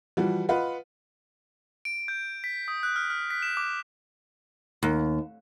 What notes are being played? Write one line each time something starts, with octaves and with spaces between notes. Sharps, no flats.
E3 F3 G3 F#4
F4 B4 D#5 F5 F#5
D7
G6
B6
D#6
F#6
F6
F6
B6
E7
D6
D#2